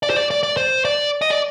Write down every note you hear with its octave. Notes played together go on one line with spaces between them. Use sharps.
D5
C5
D5
D5
D5
C5
D5
D#5
D5